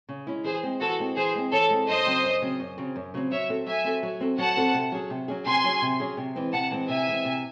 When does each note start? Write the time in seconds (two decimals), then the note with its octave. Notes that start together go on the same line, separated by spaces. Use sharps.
0.09 C#3
0.27 G#3 C#4 E4
0.44 E3 G#4 C5
0.63 G#3 C4
0.80 E3 F#4 A4
0.99 G#3 C4
1.17 E3 G#4 C5
1.34 G#3 C4
1.52 E3 A4 C#5
1.70 G#3 C4
1.87 F#2 C5 D#5
2.06 C#3 F#3 C4
2.24 F#2
2.42 C#3 F#3 C4
2.60 F#2
2.78 C#3 F#3 C4
2.96 F#2
3.14 C#3 F#3 C4
3.31 F#3 C#5 E5
3.49 C4 F#4 A4
3.66 F#3 E5 G#5
3.84 C4 F#4 A4
4.03 F#3
4.20 C4 F#4 A4
4.38 F#3 F#5 A5
4.57 C4 F#4 A4
4.74 C3
4.92 F#3 C#4 G#4
5.10 C3
5.28 F#3 C#4 G#4
5.46 C3 G#5 C6
5.64 F#3 C#4 G#4
5.82 C3
6.00 F#3 C#4 G#4
6.17 C3
6.36 E3 G#3 C4
6.53 C3 F#5 A5
6.71 E3 G#3 C4
6.89 C3 E5 G#5
7.07 E3 G#3 C4
7.25 C3